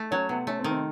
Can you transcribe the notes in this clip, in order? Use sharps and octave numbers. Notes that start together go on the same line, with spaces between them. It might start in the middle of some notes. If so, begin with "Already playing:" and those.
Already playing: A3
F#3 C#4
C3 B3
A3 C#4
C4
D#3
C4